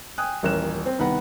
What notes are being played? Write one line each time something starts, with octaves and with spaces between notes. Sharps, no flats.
G5 G#5 D#6 F#6
D#1 A1 A#4 F#6 E7
C4
C2 D#3 B3 F#5 A#5 B5